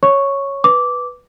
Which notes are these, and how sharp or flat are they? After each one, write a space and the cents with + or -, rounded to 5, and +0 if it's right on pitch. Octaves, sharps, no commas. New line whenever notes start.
C#5 -5 C#6 +0
B4 +0 D6 -10